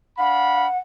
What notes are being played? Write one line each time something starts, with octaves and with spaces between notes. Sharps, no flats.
D4 F5 F#5 B5